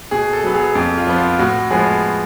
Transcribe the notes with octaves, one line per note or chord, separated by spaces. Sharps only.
B2 G#4
A4
F#3 B3
G#4
F2
F4
F3 B3
F4
A2 F#4
F3 G#3 B3 G#4